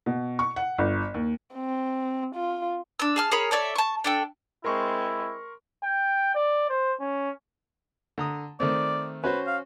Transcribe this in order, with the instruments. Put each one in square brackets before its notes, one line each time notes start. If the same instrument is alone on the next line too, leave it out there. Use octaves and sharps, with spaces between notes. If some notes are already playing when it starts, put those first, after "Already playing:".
[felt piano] B2
C#6
F#5
G1
D#2
[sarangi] C4
F4
[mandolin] D4 E6
G#4 A5 F6
G#4 A#4 C#5 B5
A4 C#5 D5 E5
A5 C#6
D4 A4 G5
[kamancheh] G#3 C4 [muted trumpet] E4 [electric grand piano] A#4 C6 C#6
[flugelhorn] G5
D5
C5
C#4
[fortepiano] D3 A#5 D#6
[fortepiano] D#3 A3 C4 [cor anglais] D5
[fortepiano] C#4 F#4 C5 [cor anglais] B4
[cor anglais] F5